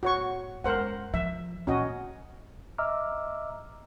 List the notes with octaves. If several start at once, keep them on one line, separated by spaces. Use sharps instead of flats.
A2 F#4 C#5 C#6
F#2 G#3 A#4 C5 F#5
F3 E5
A#2 E3 C#4 F#4 D#5
D#5 E5 A#5 D6 E6 F6